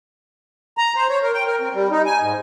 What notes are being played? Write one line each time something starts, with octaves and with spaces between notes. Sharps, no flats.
A#5
C5
C#5
A#4
G5
A#4
C4
G3
D#4
G#5
G#2